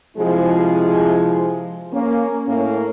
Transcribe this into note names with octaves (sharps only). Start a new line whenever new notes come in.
C3 F3 G#3 E4 G#4
A#3 C#4
A2 A#3 C#4